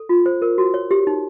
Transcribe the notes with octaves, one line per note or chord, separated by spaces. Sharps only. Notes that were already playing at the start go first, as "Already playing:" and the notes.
Already playing: A4
F4
C5
A#4
F#4
C#5
G4
D#4